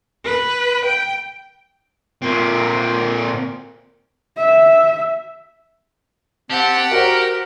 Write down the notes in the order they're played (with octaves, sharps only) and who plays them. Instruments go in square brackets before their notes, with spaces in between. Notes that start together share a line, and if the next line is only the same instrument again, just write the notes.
[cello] B4
G5
[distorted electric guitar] A#2 C4
[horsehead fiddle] E5
[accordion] C4 A5 [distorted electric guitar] G4 [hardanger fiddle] F#5
[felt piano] F#4 C5 [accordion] A#4